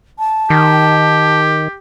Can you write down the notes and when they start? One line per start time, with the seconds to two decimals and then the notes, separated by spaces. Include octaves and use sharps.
0.19 A5
0.50 D#3 G4